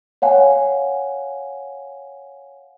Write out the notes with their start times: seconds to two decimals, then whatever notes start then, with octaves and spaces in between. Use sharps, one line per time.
0.22 C#5 F5 F#5 G#5